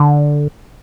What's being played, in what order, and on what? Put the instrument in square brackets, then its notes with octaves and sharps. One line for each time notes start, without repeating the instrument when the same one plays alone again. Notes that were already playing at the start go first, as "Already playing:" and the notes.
Already playing: [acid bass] D3